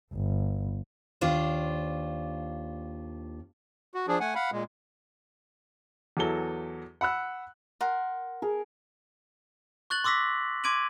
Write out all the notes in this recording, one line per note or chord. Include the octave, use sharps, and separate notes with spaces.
G1
D#2 D4 F4 C5
F#4
F3 D4 G#4
A3 F#5 G#5
F5 F#5 B5
A#2 G#3
E2 E3 F#3 A4 G7
F#5 B5 E6 F#6
A#4 F#5 C6
G#4 A#4
C#6 F#6 A6 F#7
C6 D6 E6 A#6 B6
C6 D6 G#6 D7 D#7 F#7